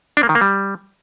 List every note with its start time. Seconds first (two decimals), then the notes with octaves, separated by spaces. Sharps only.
0.17 D4
0.23 A#3
0.29 D#3
0.35 A#3
0.41 G3